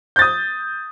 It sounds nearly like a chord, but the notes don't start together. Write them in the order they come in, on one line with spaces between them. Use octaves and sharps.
G6 A6 D#6